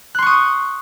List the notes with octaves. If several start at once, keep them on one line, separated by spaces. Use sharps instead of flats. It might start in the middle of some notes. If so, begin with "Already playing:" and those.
C6 C#6 D#6 F#6